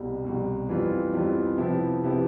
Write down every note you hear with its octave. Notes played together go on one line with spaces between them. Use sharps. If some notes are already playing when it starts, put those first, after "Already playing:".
Already playing: C2 B2 G3
C2 B2 G3
F2 E3 G3 B3 F4
F2 E3 G3 B3 F4
C3 F3 B3 E4 G4
C3 F3 B3 E4 G4